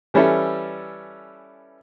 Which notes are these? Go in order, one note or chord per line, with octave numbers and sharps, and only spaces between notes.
E3 G3 C#4 E4 A4